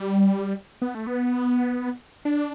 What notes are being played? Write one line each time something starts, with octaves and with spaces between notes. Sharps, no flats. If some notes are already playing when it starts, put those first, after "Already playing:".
Already playing: G3
B3
A3
B3
D4